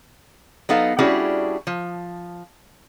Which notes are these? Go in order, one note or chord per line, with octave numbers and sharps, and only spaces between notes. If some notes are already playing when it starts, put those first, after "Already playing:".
F#3 B3 D#4 A4 F5
G3 C#4 D4 E4 F#4 G#4
F3